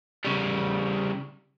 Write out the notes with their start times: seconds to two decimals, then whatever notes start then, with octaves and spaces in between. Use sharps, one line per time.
0.25 C#3 G3